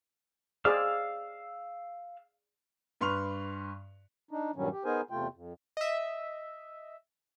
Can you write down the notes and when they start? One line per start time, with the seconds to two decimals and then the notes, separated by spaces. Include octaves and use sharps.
0.65 G#4 C5 D5 F5 E6 F6
3.01 G2 B4 C6 C#6 F6 F7
4.31 D4 D#4
4.56 G2 A#2 D#3 F#3 G3 C#4
4.72 G4
4.85 B3 D#4 G#4 A#4 C5 G#5
5.11 E2 C3 A3 F4 G5
5.34 F2
5.77 D#5 E5